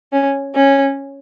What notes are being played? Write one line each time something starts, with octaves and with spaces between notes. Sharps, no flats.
C#4
C#4